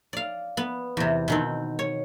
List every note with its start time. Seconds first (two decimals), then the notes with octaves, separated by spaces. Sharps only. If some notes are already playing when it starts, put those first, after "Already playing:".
0.13 D5 F5
0.57 B3
0.97 E2 C3
1.28 B2 D#3 C4
1.79 C#5